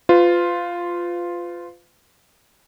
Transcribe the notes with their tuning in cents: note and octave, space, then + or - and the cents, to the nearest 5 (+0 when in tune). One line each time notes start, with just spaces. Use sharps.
F4 +0 B4 +40